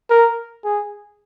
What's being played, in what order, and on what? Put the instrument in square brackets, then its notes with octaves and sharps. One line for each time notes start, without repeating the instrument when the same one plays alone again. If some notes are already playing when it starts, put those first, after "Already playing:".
[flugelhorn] A#4
G#4